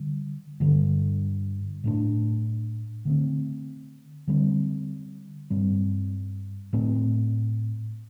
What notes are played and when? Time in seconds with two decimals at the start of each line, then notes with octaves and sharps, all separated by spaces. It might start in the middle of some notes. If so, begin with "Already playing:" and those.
Already playing: D3 G3
0.60 G2 D3 G3
1.84 A2 A3 D4
3.05 D3 A3 C4
4.27 D3 G3 C4
5.50 G2 G3 C4
6.73 A2 A3 C4